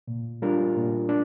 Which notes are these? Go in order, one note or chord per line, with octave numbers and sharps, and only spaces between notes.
A#2
G3 D4 F4 A#4
A#2
D4